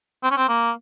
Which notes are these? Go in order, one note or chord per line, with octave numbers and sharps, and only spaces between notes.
C4
C#4
C4
A#3